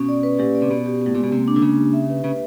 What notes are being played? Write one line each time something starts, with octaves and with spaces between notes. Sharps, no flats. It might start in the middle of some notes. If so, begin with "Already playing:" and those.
Already playing: B2 C#4
D5
B4
A#2 G4
D5
C3
B2 B3
G4
A2 B3
A#2 G#3
B2
C3 A#3
D4
D3
C#3 D4
G4
E5
B4
C#3 B4